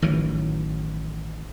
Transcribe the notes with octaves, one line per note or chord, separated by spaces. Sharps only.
A1 D#3 E3 F#3